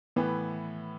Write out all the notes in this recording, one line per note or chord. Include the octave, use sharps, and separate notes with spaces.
A2 E3 B3